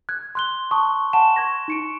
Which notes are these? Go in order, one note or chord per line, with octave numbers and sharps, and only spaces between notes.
F#6 G#6
C6 F#6 G7
A5 C#6 D#6
F#5 G#5 A5 E7
C#6 G#6 A#6
D#4 C#7 D7